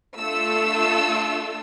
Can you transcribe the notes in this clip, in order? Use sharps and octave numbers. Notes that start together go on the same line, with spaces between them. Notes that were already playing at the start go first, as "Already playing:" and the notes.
A3 D4 F4 A4 E6